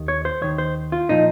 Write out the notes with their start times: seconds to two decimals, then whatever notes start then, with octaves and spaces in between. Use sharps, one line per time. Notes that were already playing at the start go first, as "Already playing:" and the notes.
Already playing: D#2 D#3
0.08 C#5
0.25 C5
0.41 D#2 D#3 C#5
0.58 C5
0.92 F4
1.09 A#2 F3 D#4